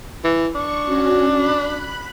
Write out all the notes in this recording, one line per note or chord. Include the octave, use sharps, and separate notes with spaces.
E3
D4 C#6
C#4 F#4
B5 F#6